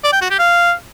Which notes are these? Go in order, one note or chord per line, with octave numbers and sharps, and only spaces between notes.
D5
G5
F#4
G4
F5